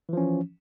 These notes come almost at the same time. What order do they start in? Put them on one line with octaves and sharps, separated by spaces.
E3 F3 C#4